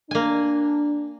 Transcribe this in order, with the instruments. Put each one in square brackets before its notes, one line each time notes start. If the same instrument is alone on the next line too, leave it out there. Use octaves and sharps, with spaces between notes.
[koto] A#3 G#5 [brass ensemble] D4